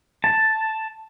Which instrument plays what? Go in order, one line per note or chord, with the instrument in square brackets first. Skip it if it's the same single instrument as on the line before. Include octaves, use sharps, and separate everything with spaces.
[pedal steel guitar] A5